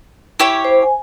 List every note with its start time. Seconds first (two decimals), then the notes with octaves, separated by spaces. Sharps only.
0.39 E4 G4 C#5
0.64 C5
0.82 G#5